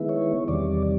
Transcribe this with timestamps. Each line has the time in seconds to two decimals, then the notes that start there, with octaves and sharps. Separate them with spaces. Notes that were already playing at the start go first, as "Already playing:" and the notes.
Already playing: D#3 G#3 B3 E4
0.09 C#5
0.48 E2 C3 D#3 G3 D5